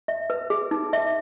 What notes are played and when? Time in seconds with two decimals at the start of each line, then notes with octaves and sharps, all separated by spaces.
0.08 E5
0.30 B4
0.50 G#4
0.71 D#4
0.93 E5